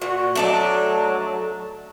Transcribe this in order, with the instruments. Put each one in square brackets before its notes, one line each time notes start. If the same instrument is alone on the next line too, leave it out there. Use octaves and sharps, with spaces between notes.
[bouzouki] A#2 [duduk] F#4
[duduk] F#3 [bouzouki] A3 D4 D#4